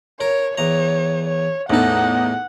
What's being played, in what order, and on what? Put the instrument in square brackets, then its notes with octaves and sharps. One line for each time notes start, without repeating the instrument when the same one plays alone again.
[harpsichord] A#4 [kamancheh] C#5
[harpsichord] E2 A#5 [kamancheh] C#5
[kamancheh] C#5
[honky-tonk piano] E2 D#4 [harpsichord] A2 A4 [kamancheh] F#5